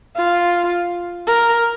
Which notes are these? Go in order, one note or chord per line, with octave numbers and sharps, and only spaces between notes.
F4
A#4